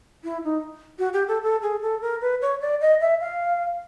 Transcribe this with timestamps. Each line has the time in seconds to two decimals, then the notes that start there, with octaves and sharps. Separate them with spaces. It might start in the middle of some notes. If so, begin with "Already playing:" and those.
0.24 E4
0.44 D#4
0.99 F#4
1.13 G4
1.28 A4
1.43 A4
1.62 G#4
1.82 A4
2.02 A#4
2.22 B4
2.42 C#5
2.61 D5
2.81 D#5
3.01 E5
3.21 F5